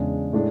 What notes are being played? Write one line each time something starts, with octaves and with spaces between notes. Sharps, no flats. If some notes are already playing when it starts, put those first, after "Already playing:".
Already playing: E2 C#3 G#3 D4
A2 G#3 D4